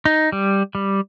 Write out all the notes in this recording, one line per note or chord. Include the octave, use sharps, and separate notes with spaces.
D#4
G3
G3